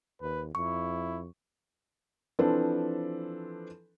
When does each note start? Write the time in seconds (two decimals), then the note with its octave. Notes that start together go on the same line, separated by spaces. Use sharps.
0.22 D#2 B4
0.55 F2 E4 C#6
2.39 E3 F3 C4 D4 A4 B4